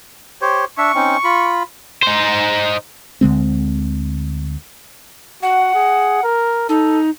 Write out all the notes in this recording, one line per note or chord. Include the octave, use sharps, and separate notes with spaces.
G4 C5 C#5
D4 E5 C#6
C4 C#4 D#4
F4 B5
D#4 C5
D2 D3 G#3 C4
F#4 F#5
G#4
A#4
D#4 A4